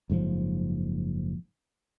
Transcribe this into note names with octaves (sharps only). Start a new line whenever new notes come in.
F#1 G#2 B2 F3